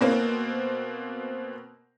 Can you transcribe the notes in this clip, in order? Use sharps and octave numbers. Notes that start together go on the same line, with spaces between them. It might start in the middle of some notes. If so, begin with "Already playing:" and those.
B2 A#3 C4